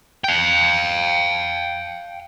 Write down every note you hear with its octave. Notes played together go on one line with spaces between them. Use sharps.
F5 G5